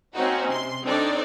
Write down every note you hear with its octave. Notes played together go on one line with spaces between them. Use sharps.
A#3 C4 C#4 D#4 F#4
C3 C6
C4 D4 D#4 A4 C#5 D5